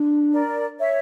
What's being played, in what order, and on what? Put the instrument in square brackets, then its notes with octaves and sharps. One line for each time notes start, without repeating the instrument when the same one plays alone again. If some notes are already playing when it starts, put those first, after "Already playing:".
Already playing: [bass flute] D4
[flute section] A#4 D5
C#5 E5